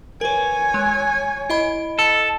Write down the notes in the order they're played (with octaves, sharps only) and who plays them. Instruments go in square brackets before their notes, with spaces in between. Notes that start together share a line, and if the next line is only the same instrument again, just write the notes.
[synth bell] A#4 B4 [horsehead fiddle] C#5 G#5
[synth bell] G#3
E4 D#5 B5
[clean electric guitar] A4